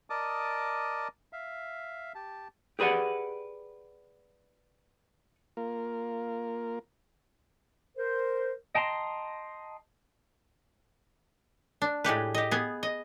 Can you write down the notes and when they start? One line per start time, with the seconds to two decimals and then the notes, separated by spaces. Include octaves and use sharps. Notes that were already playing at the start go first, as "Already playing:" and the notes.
0.10 A#4 D5 D#5 A5 D6 D#6
1.33 E5 F5
2.15 G4 A5
2.79 G4 G#4 B4 D5 F#5
5.57 A#3 F4 A#4
7.97 A#4 C5
8.75 D#5 G5 A5 A#5 C6
11.82 D4
12.04 A2 G#3 G4 B4
12.34 G4 D#5
12.51 B3 G#4
12.83 D#5